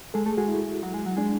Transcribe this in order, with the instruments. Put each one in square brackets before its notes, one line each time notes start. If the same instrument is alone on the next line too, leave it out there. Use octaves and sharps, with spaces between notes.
[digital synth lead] G#3 [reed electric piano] A4
[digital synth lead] A3 [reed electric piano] G#4
[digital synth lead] G#3 [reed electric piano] F#4
[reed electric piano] E4
[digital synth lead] F#3
G#3
F#3
[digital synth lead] G#3 [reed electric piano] D4